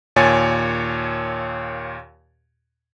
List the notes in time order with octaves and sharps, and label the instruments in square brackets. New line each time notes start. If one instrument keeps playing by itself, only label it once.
[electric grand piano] D#2 A#2 C#5 G#5 A6